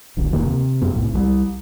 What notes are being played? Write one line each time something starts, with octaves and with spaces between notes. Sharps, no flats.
D1 B1 D3
D1 E2 D#3 A#3
C3
F#2 B3
F#1 C2 A2
C2 F#3 G3